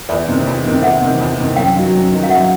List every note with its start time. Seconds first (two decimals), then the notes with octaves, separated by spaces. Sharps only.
0.09 E2 D5 E5
0.28 C3 D#3
0.46 E2
0.65 C3 D#3
0.83 E2 E5 F#5
1.01 C3 D#3
1.19 E2
1.39 C3 D#3
1.56 F#2 F5 G5
1.75 D#3 F#3
1.93 F#2
2.12 D#3 F#3
2.23 F5
2.29 F#2 E5 F#5